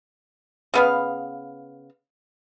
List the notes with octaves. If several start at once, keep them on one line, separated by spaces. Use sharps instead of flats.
C#3 B3 F5